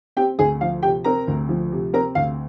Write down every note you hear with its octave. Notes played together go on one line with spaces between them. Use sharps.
C4 G4 G5
D2 G#4 G#5
F3 F5
C3 G4 G5
C4 A#4 A#5
D2
F3
C3
C4 A#4 A#5
D2 F5